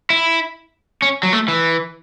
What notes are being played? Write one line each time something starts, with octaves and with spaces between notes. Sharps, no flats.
E4
C#4
F#3
A3
E3